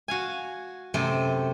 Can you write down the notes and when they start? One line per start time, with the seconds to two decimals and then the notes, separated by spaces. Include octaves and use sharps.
0.08 F#4 F5 G#5
0.94 F#2 C3 A3 C5